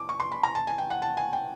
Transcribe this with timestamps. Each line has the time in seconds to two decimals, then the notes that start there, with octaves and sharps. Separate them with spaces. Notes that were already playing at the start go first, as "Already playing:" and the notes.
Already playing: D6
0.09 C#6
0.20 C6
0.32 B5
0.43 A#5
0.55 A5
0.67 G#5
0.78 G5
0.90 F#5
1.02 A5
1.17 G#5
1.33 G5